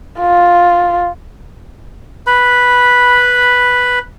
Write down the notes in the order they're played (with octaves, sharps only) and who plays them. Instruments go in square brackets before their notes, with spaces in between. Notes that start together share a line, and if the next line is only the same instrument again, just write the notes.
[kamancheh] F4
[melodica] B4 B5